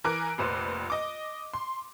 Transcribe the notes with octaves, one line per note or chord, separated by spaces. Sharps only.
E3 A#4 G#5 D6 F#6 D7
F1 A#1 B4 C5
D#5 D6
C6